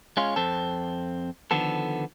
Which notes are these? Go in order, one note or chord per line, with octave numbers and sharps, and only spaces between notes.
G#3 C#4 F4
F2 C4 A4
D3 D#3 F3 B3 A4